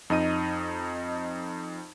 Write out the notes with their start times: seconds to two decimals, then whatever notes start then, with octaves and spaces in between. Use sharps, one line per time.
0.10 F2 D#4 D#5 D#7